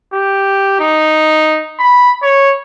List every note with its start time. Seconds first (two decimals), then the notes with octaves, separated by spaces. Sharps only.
0.13 G4
0.80 D#4
1.79 B5
2.23 C#5